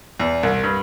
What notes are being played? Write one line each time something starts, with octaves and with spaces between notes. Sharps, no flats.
E2
C2
G2